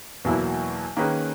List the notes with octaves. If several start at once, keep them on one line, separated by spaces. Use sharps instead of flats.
E2 B2 F#3 A#3 E4
D#3 A#3 C#4 G#4 B4